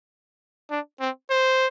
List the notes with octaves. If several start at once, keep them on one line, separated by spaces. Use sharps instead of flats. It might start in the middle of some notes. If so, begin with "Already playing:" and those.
D4
C4
C5